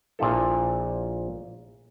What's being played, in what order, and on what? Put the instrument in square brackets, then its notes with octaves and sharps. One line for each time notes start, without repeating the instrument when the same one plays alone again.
[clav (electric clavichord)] A#1 A#2 F3 E4 A4